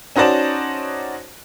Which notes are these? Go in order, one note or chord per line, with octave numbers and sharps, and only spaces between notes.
C#4 D#4 F#4 C5 D5 A5